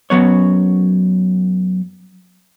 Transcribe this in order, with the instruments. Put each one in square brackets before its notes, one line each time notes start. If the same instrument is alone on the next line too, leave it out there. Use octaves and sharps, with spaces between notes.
[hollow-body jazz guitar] F#2 A#2 F#3 B3 C#5